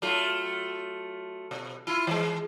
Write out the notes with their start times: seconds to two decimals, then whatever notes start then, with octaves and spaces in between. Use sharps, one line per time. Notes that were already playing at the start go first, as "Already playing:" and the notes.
0.02 F#3 A3 F4
1.51 B2
1.87 E4 F4
2.07 E3 G#3